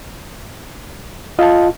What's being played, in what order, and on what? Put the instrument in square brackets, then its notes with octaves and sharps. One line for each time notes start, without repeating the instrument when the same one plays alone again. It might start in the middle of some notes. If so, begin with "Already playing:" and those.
[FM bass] F4 [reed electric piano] D#5 F5 A5